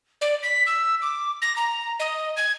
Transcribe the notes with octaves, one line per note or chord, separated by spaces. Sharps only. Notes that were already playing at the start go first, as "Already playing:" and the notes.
D5
B6
E6
D6
A#6
A#5
D#5
G#6